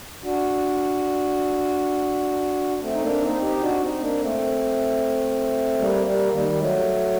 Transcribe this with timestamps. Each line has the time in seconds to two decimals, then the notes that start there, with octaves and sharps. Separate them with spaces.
0.23 D4 F#4
2.82 A3 C4
2.92 D#4
3.02 A#3 D4
3.21 C4 D#4
3.41 D#4 G4
3.61 D4 F#4
3.81 C4 D#4
4.00 A#3 D4
4.20 A3 C4
5.79 G3 A#3
6.05 G3 A#3
6.32 D#3 G3
6.58 F#3 A3